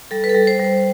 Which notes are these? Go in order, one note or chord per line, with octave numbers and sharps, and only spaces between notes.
G3 A4
B4
A4
G3
C5
G3
C5